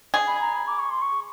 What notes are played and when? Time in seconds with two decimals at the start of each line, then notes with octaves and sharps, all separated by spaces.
0.14 G#4
0.27 B5
0.41 A#5
0.54 B5
0.67 D6
0.78 C#6
0.90 C6
1.01 C#6